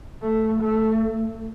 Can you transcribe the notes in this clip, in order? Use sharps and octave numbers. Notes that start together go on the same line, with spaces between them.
A3
A3